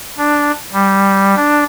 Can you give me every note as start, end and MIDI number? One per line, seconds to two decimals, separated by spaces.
0.18 0.52 62
0.73 1.35 55
1.36 1.64 62